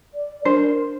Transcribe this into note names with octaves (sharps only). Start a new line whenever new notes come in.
D5
D4 A#4 C5